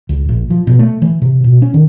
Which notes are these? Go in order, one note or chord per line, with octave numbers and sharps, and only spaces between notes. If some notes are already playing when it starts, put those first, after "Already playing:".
C#2
A#1
F3
B2
A3
E3
C3
B2
C#4
D#3